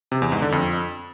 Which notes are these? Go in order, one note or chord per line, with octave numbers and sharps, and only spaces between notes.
C3
E2
G#2
D3
F2